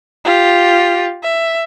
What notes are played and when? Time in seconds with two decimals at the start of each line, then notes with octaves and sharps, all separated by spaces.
0.25 F4 G4
1.23 E5